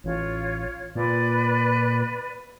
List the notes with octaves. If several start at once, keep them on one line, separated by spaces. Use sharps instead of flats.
A1 F4 C#5
A#2 B4 D5